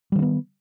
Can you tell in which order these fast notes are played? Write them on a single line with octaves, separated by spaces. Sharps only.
G3 D#3 C#4 B3